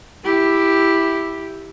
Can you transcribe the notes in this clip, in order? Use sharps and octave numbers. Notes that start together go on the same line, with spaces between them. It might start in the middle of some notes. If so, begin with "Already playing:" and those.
E4 G4